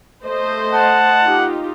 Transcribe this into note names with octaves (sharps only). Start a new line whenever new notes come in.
A3 C5 D#5
F#5 A5
D#4 F4 G4